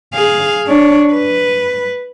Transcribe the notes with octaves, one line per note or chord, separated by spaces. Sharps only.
G#4 F5
D4 C#5
B4